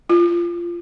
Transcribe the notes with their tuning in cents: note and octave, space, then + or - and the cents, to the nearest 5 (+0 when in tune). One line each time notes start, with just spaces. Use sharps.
F4 -20